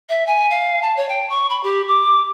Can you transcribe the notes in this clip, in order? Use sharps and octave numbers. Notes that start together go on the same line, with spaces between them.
E5
G#5
F5
A5
C#5
G5
C#6
B5
G4
D6